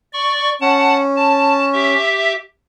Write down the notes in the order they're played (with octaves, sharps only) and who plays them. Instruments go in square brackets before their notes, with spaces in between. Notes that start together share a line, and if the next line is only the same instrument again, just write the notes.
[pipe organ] D5 C#6
[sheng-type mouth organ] C#4 [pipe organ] F#5 A5
[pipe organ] A5
G4 E5